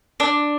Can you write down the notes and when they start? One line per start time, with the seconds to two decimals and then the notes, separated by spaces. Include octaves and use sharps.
0.20 D4